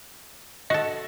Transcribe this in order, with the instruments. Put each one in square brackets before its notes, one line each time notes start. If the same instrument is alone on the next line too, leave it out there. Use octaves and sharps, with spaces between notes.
[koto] F#4 A4 [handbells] D#5